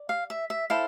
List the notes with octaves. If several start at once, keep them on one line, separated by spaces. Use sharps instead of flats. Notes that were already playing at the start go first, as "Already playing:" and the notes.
Already playing: D5
F5
E5
E5
E4 A4 C5 F5